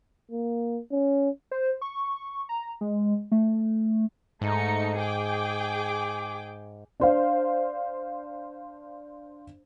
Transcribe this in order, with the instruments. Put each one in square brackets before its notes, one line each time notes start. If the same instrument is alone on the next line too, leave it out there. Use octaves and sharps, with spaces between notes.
[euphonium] A#3
C#4
[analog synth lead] C5
C#6
A#5
G#3
A3
[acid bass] G#2 [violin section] A3 D#4 C#7
[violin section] G#4 G5 D6
[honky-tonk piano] D4 C5 F5